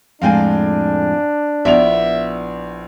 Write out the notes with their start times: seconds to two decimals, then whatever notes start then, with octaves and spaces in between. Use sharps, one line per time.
0.22 F2 A2 G#3 D4 F5 G5 G#5
1.65 A#1 B3 E4 D5 E5 F7